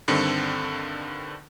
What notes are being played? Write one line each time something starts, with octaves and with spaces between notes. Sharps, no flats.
G2 D3 D#3 C4